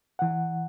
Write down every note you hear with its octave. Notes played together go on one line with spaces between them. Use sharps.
E3 F#5